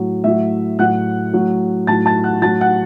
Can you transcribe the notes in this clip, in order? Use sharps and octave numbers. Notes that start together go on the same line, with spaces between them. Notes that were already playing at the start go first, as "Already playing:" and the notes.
Already playing: A2 F#3
A2 F#3 E5
A2 F#3 F#5 F#6
A2 F#3
A2 F#3 A5 A6
A5 A6
F#5 F#6
A2 F#3 A5 A6
F#5 F#6